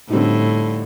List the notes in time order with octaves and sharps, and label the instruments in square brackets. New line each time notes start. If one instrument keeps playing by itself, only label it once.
[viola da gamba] A2 [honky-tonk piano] D3 G3 C4 D#4